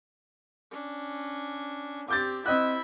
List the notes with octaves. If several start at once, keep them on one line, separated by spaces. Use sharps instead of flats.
C#4 D4
C4 G4 D6 G6 A6
C4 E4 D#5 E5 F#6